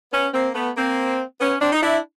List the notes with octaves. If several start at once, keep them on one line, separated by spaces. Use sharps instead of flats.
B3 C#4
A#3 C4
A3 B3
A#3 C4
B3 C#4
C4 D4
D#4
D4 E4